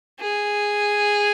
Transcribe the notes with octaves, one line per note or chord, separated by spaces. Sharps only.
G#4